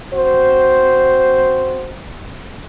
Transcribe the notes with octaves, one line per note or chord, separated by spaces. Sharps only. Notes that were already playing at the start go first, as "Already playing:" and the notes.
C4 F#4 C5